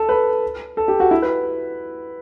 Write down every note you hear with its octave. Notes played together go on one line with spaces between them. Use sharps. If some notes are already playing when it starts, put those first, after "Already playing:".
Already playing: A4
B4
A4
G4
F#4
E4
B4